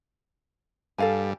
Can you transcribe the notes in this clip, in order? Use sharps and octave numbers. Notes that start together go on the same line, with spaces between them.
G2 A4 F5 G#5